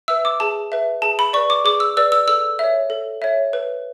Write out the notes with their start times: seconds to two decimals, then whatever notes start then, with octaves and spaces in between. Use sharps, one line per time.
0.08 B4 E5 E6
0.25 D6
0.40 G#4 A5
0.72 B4 E5
1.02 G#4 A5
1.19 B5
1.33 B4 D5 C#6
1.50 D6
1.65 G#4 D6
1.80 E6
1.97 B4 D5 E6
2.12 E6
2.28 A4 E6
2.59 C#5 E5
2.90 A4
3.22 C#5 E5
3.53 B4